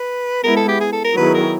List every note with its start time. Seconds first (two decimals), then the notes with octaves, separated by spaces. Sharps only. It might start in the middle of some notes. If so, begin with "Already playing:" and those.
Already playing: B4
0.44 G#3 B3 E4 A#4
0.56 A4
0.68 G4
0.80 G#4
0.92 A4
1.04 A#4
1.17 D#3 F#3 B3 E4 G#4 B4
1.34 A#4